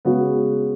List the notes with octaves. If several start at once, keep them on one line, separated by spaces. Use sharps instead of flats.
C#3 G#3 B3 F#4